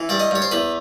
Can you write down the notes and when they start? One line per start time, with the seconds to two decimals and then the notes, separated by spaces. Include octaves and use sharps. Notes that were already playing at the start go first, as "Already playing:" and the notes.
Already playing: E3
0.09 G2 D5
0.20 D#5
0.31 G2 C#5
0.42 C5
0.51 E2 B4